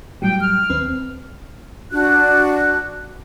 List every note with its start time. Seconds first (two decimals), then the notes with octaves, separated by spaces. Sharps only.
0.22 A2 F#3 G3 G5
0.41 F6
0.70 D#2 C4 B4
1.93 D4 F#4 F#6